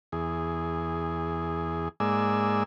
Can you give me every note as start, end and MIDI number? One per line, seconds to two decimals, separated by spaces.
0.12 1.89 40
0.12 1.89 68
2.00 2.63 44
2.00 2.63 56
2.00 2.63 58
2.00 2.63 74
2.00 2.63 80
2.00 2.63 88